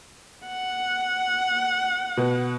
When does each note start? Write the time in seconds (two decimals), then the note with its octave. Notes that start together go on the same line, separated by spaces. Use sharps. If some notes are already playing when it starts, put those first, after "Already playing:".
0.47 F#5
2.17 B2